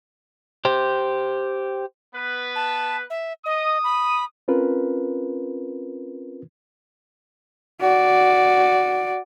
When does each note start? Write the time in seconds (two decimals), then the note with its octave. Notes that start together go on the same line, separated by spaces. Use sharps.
0.65 G4 C5
2.14 B3 B4
2.56 A5
3.10 E5
3.46 D#5 D#6
3.84 B5
4.48 C4 C#4 F4 A#4 B4
7.81 F#4 D5